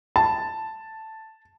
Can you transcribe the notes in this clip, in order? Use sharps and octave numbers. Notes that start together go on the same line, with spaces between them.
A5